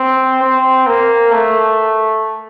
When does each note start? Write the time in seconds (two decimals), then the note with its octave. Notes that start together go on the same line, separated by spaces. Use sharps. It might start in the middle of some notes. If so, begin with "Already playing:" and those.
Already playing: C4
0.42 C4
0.87 A#3
1.32 A3